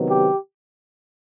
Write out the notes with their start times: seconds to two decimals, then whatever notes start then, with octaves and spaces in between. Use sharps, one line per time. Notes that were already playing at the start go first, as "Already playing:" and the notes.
Already playing: C3 D#3 F#3 B3
0.10 G4